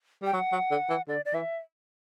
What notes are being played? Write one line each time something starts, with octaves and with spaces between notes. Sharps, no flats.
G3 G5
F#3 F#5
F#3
D3
E3
D3 D5
D5
E3 E5